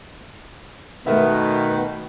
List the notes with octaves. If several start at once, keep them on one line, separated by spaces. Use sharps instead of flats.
B2 D#3 A3 B3 A#4 E5